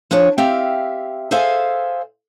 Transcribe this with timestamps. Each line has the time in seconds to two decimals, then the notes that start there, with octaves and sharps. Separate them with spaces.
0.11 F3 D4 G#4 C#5
0.38 C4 G4 E5 F5
1.31 G#4 A4 C5 E5 F5 G#5